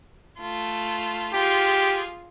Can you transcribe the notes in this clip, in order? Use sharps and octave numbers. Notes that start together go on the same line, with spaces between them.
A3 F4
F4 G4 G#4